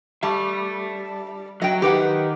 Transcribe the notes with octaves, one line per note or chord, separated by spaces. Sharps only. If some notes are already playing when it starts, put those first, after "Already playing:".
G3 E5 A5
F#3 D#5 G5
D#3 G4 B4 F#5